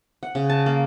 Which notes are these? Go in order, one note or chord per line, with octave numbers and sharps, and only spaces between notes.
F#5
C#3
A5
A#3